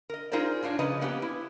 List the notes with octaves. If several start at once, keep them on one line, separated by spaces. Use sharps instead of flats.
A#4 D#5
D#4 F4 G#4 A#4 C5 D5
A2 D4 F4 C#5
C#3 F3 B4 D#5 A#5
A#3 B3 C#4 G4
E4